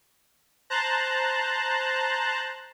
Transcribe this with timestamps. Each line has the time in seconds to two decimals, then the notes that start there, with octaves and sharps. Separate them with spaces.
0.70 C5 A5 A#5 F#6